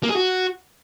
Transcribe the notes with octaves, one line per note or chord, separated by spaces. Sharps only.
A#3
G#4
F#4